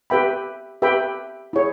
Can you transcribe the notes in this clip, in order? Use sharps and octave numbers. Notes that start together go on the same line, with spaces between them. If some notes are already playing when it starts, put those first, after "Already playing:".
G4 B4 E5 G5 B5
G4 B4 E5 G5 B5
E4 G#4 C#5